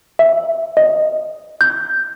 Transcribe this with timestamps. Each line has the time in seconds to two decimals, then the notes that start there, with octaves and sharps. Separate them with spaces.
0.19 E5
0.77 D#5
1.61 G6